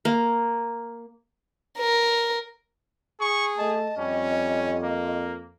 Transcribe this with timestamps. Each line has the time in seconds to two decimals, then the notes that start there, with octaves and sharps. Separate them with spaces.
0.05 A#3
1.78 A#4
3.20 G#4 C#6
3.58 A3 D#5 A5
3.98 F2 G3 C#4
4.83 A#3